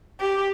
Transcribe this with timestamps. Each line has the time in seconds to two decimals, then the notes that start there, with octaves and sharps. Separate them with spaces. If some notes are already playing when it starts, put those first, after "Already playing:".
0.21 G4